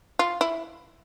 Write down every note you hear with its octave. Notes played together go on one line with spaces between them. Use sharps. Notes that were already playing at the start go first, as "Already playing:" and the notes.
F4
E4